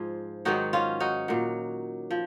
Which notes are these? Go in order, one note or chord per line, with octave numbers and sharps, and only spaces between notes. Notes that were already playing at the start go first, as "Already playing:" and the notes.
Already playing: G#2 F3 F4 G#4
G#2 D#3 F#3 D#4 F#4
C#4 F4
D#4 F#4
A#2 F#3
F3